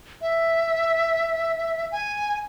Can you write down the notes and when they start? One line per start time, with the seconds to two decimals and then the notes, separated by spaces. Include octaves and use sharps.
0.22 E5
1.92 G#5